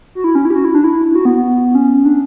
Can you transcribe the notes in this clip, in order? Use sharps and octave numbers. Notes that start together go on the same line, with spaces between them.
F#4
E4
C#4
E4
G4
F#4
E4
D4
E4
F#4
B3
B3
C#4
D4